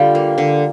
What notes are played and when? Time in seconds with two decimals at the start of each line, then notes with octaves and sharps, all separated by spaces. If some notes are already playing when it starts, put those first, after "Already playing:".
Already playing: D3 G3 F4 G4
0.15 A#3
0.38 D3